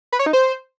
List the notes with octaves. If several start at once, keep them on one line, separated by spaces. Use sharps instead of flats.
B4
C#5
D#4
C5